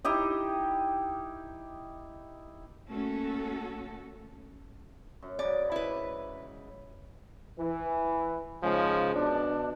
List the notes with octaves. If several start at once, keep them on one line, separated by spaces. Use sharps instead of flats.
D#4 E4 G4 D#5
A3 A#3 C#4 F#4 A4
F#2
G#2 C#3 D5
E4 B4
E3
G#2 C#3 F3 G#3
B2 D4